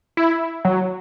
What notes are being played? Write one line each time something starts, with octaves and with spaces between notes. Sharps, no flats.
E4
F#3